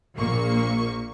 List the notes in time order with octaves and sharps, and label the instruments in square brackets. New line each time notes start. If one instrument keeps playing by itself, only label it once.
[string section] A#1 A#2 A#3 C#6